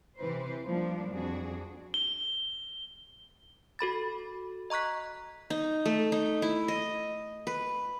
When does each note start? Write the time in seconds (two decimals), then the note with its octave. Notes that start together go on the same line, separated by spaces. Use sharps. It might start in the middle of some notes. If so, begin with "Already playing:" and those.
0.18 C3 E3 B4 C5
0.66 F3 G3 A#3 D4
1.12 F2 D4 F#4 G#4
1.94 G7
3.79 F#4 A4 B5 A6
4.70 D#5 A#5 C#6 F#6 B6
5.50 D#4
5.85 A3
6.12 D#4
6.42 E4
6.68 D#5
7.47 B4